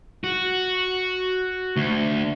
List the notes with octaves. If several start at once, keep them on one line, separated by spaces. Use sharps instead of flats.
F#4
D2